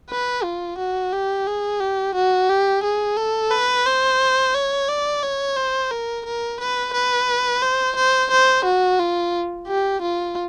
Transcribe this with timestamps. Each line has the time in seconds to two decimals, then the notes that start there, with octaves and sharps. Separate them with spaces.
0.10 B4
0.44 F4
0.78 F#4
1.13 G4
1.47 G#4
1.80 G4
2.15 F#4
2.50 G4
2.84 G#4
3.17 A4
3.51 B4
3.86 C5
4.54 C#5
4.88 D5
5.23 C#5
5.56 C5
5.91 A#4
6.26 A#4
6.60 B4
6.93 B4
7.62 C5
7.96 C5
8.31 C5
8.65 F#4
8.99 F4
9.68 G4
10.02 F4